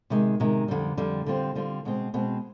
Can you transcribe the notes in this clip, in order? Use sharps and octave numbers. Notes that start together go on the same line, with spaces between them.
C3 D#3 G#3
C3 D#3 G#3
F2 D3 G3
F2 D3 G3
D3 G3 C4 F4
D3 G3 C4 F4
B2 G#3 C4
B2 G#3 C4